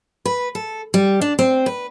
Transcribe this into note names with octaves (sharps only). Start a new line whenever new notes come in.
B4
A4
G3
D4
C4
B4